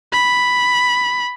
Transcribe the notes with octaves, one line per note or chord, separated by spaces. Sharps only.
B5